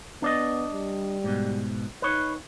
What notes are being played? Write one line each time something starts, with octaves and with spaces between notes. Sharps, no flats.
B3 D4 D5 D#5
G3
G#2 B2
D#4 B4 C#5